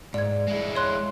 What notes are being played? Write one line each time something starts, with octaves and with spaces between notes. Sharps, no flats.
G#2 D5 G#6
G#3 E4
C#5 C6 F#6